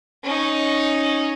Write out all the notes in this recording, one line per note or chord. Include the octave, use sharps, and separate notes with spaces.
C#4 D#4